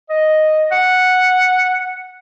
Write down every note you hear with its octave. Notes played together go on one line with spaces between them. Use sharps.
D#5
F#5